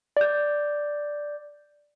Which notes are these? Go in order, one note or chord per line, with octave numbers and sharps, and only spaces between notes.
D5 G6